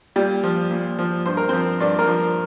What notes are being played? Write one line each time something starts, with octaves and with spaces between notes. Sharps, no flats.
A#2 G3 G4
F3
A#2
F3
G2 C5
A#4
F3 C4 C5
G2 D4 D5
A#3 A#4
F3